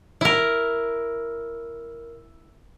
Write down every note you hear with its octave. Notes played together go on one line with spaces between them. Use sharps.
E4 A#4